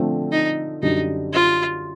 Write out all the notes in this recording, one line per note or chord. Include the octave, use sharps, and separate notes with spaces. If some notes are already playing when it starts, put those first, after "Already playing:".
Already playing: D3 F3 A3 C4
D#4
F#2 D3 G3 D#4
F4